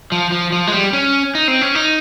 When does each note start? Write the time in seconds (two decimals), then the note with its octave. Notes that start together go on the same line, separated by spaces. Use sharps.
0.12 F3
0.32 F3
0.52 F3
0.67 G#3
0.72 G3
0.93 C#4
1.35 D#4
1.48 C4
1.61 C#4
1.75 D#4